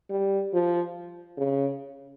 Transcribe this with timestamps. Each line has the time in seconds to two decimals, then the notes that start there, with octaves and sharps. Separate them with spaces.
0.10 G3
0.53 F3
1.37 C#3